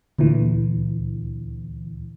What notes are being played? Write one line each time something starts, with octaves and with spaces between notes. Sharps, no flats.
D2 A#2 D3 E3